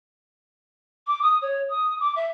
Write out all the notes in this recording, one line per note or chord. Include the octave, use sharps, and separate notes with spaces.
D6
D#6
C#5
D#6
D6
E5